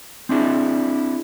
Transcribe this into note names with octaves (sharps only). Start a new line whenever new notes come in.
C4 D4 E4 G#4